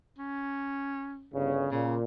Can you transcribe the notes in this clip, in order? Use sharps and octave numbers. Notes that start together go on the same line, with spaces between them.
C#4
G1 C#3
A#2 C#3